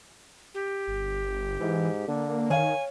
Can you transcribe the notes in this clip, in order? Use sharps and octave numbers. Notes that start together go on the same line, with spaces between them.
G4
G1
G#2 E3
D3 A#3
D#3 C#5 F5 G#5